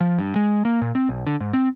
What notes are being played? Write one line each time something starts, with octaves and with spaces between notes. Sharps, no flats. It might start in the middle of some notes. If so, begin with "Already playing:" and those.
F3
G2
G#3
A#3
A#2
C4
B1
D3
G#2
C4